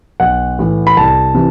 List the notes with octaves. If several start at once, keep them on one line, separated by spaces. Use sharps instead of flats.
B1 F#5
A2 E3
B5
C2 A5
C3 E3